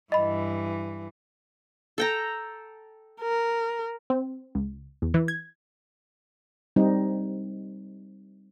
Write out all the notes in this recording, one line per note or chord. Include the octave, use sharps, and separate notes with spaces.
G2 E3 D#5 B5
A4 G5 A#5
A#4
C4
C#2
E2
E3
G#6
G3 C4 D#4